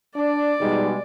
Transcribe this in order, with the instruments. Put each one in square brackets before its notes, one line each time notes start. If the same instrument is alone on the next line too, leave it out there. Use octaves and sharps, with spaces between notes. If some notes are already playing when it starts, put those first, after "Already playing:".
[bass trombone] D4 [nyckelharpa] D5
[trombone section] B2 G3 G#3 [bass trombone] D#4